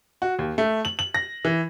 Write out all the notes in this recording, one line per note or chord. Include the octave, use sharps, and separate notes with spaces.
F#4
D#2
A3
F#7
F#7
A#6
E3